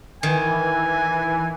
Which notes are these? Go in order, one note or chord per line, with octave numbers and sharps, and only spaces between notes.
D#3 E3 G#5